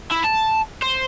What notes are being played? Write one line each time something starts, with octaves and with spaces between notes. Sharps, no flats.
E4
A5
C5